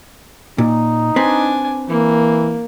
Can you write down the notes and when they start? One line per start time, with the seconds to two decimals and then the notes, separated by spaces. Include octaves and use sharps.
0.58 A#2 D#4
1.16 C4 D4 B4 G#5
1.89 E3 A#3